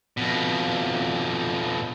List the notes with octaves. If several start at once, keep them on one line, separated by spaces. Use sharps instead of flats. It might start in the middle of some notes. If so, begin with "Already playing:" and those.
F2 B2